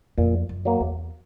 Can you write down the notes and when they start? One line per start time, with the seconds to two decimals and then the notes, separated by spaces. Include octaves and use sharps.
0.18 F2 A#2
0.49 F#2
0.65 F#3 A#3
0.81 E2